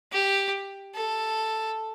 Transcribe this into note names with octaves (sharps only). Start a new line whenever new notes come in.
G4
A4